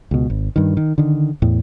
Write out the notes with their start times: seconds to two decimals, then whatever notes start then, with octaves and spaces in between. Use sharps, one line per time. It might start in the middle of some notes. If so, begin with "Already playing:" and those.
0.11 C#2 B2
0.30 G#1
0.56 G2 D#3
0.77 D#3
0.98 D3 D#3
1.42 E2 A2